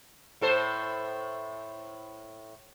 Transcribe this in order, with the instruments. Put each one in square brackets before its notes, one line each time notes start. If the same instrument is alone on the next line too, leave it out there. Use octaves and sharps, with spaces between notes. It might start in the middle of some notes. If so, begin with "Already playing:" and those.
[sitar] A2 A4 C5